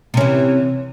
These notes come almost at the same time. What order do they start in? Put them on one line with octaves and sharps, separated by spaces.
C3 C#4 E3